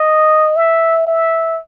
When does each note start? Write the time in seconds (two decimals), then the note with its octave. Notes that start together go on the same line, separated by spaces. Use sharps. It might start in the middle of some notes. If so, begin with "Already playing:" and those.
Already playing: D#5
0.56 E5
1.07 E5